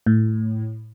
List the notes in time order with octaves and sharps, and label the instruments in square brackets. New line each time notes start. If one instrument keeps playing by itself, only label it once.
[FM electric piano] A2